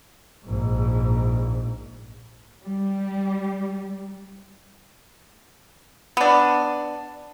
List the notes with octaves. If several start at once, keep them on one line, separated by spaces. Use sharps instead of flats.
A#1 G#2
G3
B3 D4